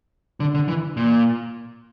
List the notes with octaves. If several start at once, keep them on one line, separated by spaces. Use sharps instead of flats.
D3
D3
E3
A#2